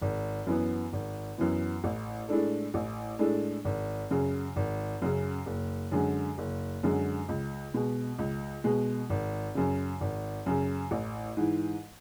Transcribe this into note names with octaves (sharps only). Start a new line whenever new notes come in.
G#1
F#2 E3 B3
G#1
F#2 E3 B3
A1
A2 G#3 D4 A4
A1
A2 G#3 D4 A4
G#1
F#2 C#3
G#1
F#2 C#3
F#1
F#2 D3 G#3
F#1
F#2 D3 G#3
C#2
B2 G#3
C#2
B2 G#3
G#1
F#2 C#3
G#1
F#2 C#3
A1
G#2 E3